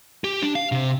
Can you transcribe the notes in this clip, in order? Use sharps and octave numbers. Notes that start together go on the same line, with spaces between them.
G4
D4
F5
C3